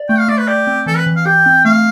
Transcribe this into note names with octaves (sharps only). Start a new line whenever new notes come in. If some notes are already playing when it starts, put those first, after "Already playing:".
Already playing: D5
A3 G5
F5
A3 D5
B4
G4 D5
C4
E3 A4
B4
E3
F5
G4 G5
C4
A3 F5